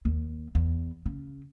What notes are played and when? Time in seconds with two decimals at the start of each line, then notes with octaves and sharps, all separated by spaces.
0.05 D#2
0.55 E2
1.06 C#3